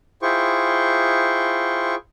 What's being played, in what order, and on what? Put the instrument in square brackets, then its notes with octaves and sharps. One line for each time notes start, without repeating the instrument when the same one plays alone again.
[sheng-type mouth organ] E4 F4 G#4 C5 G5 C#6